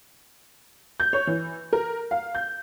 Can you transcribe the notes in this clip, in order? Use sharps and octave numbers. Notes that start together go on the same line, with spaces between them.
G6
C#5
E3
A#4
F5
G6